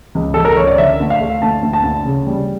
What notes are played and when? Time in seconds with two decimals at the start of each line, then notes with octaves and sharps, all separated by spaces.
0.15 C#2
0.34 C#2 A4
0.45 A#4
0.57 C#2 C#5
0.67 D5
0.78 D3 E5
1.00 D2
1.10 F5
1.21 A3
1.42 D2 A5
1.63 D2
1.73 A5
1.84 D2
2.05 C#3
2.27 G3